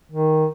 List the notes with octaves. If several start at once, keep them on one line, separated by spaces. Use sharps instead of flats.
D#3